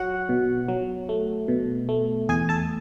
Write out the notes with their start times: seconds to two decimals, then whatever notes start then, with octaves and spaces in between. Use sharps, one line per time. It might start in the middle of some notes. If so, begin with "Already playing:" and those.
Already playing: F#3 F#4 F#5
0.29 B2
0.68 F#3
1.09 A3
1.48 B2
1.89 A3
2.29 E2 G#4 G#5
2.49 A4 A5